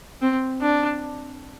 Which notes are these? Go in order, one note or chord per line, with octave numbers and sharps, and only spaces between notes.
C4
D4